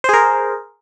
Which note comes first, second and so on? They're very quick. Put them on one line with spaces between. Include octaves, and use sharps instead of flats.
C5 G#4 A#4